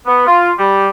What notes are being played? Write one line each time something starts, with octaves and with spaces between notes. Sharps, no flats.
B3
F4
G3